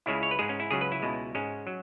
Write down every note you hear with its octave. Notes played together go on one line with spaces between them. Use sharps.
C#2 C#3 G#3 E4
C#5
B4
G#2 G#3 G#4
C#4
E4
C#2 C#3 F#3 G#4
B4
E4
C#2 B2 G#3
G#2 G#3 C#4
F#3